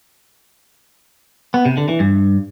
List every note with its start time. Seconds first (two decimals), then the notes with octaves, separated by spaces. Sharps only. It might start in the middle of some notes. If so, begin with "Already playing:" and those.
1.54 B3
1.65 C3
1.77 D3
1.89 E3
2.00 G2